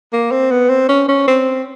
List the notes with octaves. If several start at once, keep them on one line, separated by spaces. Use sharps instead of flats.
A#3
C4
B3
C4
C#4
C#4
C4